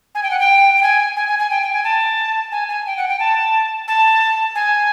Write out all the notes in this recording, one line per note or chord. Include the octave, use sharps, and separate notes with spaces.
G#5
G5
F#5
G5
G5
G#5
G#5
G#5
G#5
G5
G5
G#5
A5
G#5
G#5
G5
F#5
G5
A5
A5
G#5